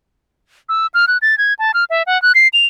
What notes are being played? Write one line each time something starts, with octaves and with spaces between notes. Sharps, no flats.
E6
F6
F#6
A6
G#6
A5
F6
E5
F#5
F#6
C7
F7